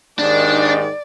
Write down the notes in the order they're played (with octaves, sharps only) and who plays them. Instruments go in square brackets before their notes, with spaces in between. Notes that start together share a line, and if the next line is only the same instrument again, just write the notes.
[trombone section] D#2 G#2 D#3 [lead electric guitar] D4 [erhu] D5